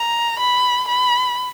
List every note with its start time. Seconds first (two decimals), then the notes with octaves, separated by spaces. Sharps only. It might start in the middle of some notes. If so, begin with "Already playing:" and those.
Already playing: A#5
0.40 B5
0.88 B5